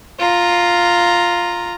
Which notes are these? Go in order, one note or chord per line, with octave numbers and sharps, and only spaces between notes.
F4 A#5